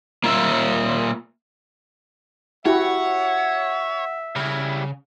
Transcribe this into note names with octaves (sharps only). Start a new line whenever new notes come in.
A#3 F4 E5
E4 F#4 G4 C#5 E5 F#5
C#3 G3 E4